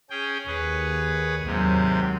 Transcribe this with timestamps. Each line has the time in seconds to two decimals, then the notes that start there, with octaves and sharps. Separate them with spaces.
0.10 C#4 G#4 G5
0.47 D#2 G#4 B4 C#5
1.46 D#2 G#2 C3 F#3 G4